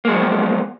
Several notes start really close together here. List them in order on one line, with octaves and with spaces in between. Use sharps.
A#3 G#3 F#3 F3 B3